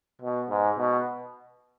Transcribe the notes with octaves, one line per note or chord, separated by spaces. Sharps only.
B2
G#2
B2